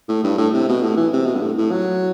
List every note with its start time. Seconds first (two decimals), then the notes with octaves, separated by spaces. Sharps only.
0.08 A2
0.24 G2
0.38 A2
0.54 C3
0.69 B2
0.82 A2
0.97 E3
1.13 C3
1.27 B2
1.35 G2
1.41 A2
1.57 A2
1.71 F#3